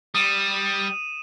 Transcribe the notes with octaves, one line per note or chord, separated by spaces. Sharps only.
G3 D#6 D#7 E7